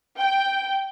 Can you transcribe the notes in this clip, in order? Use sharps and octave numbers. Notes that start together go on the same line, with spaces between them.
G5